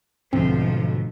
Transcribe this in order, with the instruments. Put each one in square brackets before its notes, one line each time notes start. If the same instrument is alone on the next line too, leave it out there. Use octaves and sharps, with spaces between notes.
[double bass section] B1 [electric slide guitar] G#2 D3 A3 [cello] F3 [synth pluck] C4